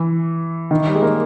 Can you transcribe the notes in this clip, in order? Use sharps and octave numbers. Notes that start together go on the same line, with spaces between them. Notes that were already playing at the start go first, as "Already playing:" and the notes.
Already playing: E3
D#3
G3
G#3
A#3